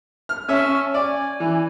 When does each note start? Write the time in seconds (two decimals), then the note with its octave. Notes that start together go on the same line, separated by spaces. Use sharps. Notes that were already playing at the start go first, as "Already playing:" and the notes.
0.29 F6
0.48 C#4 E5 A5 C#6 F6
0.94 D5 G#5
1.40 E3